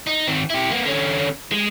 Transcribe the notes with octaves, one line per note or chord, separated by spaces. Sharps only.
D#4
D#3 C4
E4 G4
A#3 B3
D3 C#4
G#3